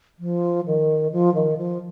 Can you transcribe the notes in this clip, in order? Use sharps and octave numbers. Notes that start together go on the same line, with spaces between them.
F3
D#3
F3
D#3
F3